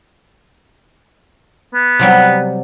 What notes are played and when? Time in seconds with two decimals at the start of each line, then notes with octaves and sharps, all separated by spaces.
1.74 B3
1.99 C3 F#3 G3